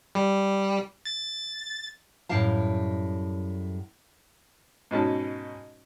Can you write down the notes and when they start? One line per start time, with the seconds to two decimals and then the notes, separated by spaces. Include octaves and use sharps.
0.15 G3
1.05 A6
2.29 F#2 A2 G3 F5 A5
4.91 G#2 B2 C#4 A5